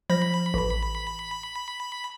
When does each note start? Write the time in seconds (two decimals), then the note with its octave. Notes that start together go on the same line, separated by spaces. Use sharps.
0.10 F3 B5 A#6
0.54 A1